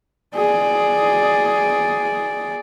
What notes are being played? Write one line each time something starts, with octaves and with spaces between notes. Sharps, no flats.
G#4 D5